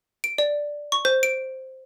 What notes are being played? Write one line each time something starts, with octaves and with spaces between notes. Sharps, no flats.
D7
D5
C#6
C5
D7